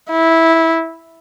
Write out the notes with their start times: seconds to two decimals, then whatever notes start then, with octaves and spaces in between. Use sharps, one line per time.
0.11 E4